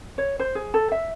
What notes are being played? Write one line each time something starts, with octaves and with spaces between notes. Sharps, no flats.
C#5
C5
G#4
A4
E5